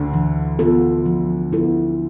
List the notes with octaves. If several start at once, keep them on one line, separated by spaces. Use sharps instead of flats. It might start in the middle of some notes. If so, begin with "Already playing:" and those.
Already playing: D2 D3
E3
B3 F4 A4
F3
B3 E4 A4